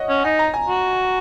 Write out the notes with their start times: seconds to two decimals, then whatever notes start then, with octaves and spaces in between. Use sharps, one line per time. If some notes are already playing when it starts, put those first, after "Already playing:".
Already playing: C#5 D#5 F#5
0.09 C#4
0.24 D#4 G#5
0.39 A#5
0.54 G#5
0.68 F#4